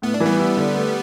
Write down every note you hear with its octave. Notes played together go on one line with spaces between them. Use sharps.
A2 B3
D4
E3
G3 B3
E4
D3
A3